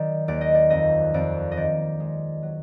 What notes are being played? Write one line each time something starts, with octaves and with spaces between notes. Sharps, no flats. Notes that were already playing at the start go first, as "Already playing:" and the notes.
Already playing: D#3 F#3 D5
D#2 D5
D#5
D5
F2 D#5
F2 D5
D#5
D#3 D5
G#3
F#3